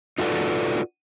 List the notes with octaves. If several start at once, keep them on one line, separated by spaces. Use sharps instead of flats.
D#4 F4 F#4 A4 B4 D5